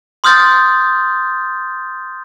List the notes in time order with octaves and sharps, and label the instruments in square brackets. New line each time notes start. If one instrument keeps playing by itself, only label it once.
[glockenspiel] C6 D#6 F6 G6 A6